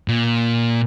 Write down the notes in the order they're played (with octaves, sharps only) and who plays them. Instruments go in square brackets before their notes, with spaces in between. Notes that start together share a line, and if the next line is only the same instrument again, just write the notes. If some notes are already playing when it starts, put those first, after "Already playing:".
[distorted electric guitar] A#2